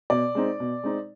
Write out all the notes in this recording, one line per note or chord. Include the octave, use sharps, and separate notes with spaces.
B2 D5
G#3 C4 D#4
B2
G#3 C4 D#4